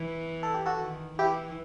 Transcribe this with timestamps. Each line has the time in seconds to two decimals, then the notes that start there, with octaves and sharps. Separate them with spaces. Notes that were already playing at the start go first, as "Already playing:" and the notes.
Already playing: E3
0.43 A4
0.54 G4
0.66 F#4 A4
0.81 D#3
1.19 E3 E4 G4